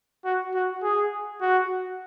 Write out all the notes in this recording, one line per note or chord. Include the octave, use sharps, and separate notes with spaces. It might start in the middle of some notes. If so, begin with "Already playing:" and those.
F#4
F#4
G#4
F#4